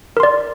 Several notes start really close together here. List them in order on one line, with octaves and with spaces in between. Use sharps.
A#4 C6 D5